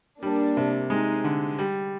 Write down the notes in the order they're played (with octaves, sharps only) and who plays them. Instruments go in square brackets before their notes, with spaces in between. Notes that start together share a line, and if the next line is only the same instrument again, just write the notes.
[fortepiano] G3 [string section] A#3 D4
[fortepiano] C3
[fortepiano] G#3 [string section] C4 D#4
[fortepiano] D3
G3